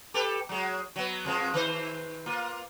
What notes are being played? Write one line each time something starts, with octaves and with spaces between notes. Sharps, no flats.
G4 A4 B4
F#3 G#3
F#3 B3
F2 F3 G#3
D#3 B4 C5
A#3 F4